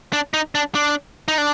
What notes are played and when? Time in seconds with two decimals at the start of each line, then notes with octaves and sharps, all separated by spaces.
0.13 D4
0.34 D#4
0.55 D4
0.75 D4
1.28 D#4
1.38 D4